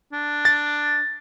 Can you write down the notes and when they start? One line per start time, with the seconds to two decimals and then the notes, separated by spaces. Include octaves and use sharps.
0.13 D4
0.45 A6